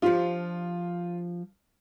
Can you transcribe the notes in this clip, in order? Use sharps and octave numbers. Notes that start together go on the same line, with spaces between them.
F3 D4 F4 G4